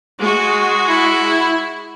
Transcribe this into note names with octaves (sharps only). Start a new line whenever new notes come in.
G#3 F#4
E4